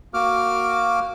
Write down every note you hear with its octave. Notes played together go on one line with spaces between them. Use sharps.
A#3 F#4 D6 F6